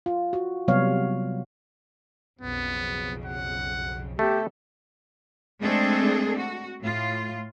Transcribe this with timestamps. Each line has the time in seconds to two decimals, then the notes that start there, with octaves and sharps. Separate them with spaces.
0.06 F4
0.33 F#4
0.68 C3 F#3 G3 B3 C#5 F5
2.41 B1 F2 C#3 B3
3.25 F#5
4.19 C3 A3 B3 G4 A4
5.61 G#3 A3 C4 D4 G#4 A4
6.40 F#4
6.82 A2 F4